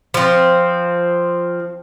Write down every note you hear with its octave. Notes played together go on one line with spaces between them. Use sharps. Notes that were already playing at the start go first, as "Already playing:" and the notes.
F3 C4